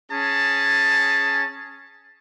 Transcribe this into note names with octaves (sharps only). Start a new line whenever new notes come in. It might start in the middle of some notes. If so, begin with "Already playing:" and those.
C#4 G#4 A5